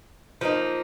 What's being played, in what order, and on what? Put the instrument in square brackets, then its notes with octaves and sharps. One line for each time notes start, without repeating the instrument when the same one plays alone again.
[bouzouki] F3 A#3 D#4